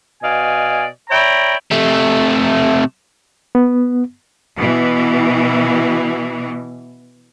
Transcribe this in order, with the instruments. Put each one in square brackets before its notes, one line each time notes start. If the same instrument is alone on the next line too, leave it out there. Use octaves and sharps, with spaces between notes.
[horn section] B2 D5 D#5 F5 G#5
C#5 D5 E5 G5 A#5 B5
[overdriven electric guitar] C3 A3
[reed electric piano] B3
[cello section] B2 E3